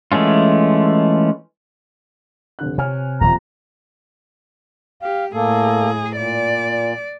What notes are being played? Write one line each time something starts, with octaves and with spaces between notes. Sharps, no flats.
E3 G#3 A3 C#4 F4
F1 D3 F#6
C3 C#5 G#5 F6
D#1 F2 A#2 A#5
G4 F5
A2 A#3 G#4 A4
A#2 D5